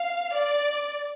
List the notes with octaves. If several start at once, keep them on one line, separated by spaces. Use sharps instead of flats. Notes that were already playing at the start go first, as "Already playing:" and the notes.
Already playing: F5
D5